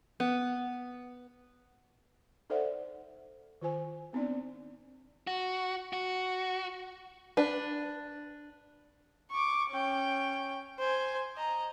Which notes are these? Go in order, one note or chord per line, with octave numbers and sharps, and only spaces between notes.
B3
D#4 A4 C5 D5 E5 F#5
D#3 F4 C5 G#5
B3 C4 D4 D#4 D5
F#4
F#4
D4 B4
C#6 D6
C#4 G5
C5 G#5
D#5 A#5